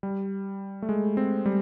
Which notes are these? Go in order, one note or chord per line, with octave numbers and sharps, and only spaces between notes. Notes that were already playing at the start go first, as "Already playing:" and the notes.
G3
A3
G#3
C4
G3